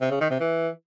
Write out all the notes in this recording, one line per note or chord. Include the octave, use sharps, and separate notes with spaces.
C3
C#3
D#3
C3
E3